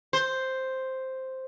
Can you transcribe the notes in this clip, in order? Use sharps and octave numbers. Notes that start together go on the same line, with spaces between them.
C5